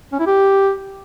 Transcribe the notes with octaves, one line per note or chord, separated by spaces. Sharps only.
C#4
E4
G4